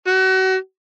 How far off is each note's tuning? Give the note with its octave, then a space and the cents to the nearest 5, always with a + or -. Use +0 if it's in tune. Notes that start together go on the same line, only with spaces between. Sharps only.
F#4 +35